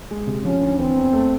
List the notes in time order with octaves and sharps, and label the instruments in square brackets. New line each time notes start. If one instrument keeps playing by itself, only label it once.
[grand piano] G#3
C3
[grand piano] F3 [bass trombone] C#4
[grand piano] D2
[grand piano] E3 [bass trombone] C4
[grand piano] E2
A3